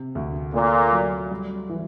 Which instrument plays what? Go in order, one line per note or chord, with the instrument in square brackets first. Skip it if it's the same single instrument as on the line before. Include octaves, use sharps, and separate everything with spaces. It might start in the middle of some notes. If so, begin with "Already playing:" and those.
Already playing: [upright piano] C3
D2
[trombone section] A#2 [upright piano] A3
[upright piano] F#3
G3
E3